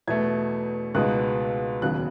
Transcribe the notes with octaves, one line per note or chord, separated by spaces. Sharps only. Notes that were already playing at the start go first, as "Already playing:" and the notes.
E2 B2 A3 G#6
C#2 B2 G#3 D#4 F#6
E1 D#2 C#3 F#3 F#6